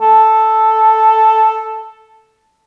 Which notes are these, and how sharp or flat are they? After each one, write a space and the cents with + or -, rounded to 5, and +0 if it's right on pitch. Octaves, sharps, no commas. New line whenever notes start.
A4 +0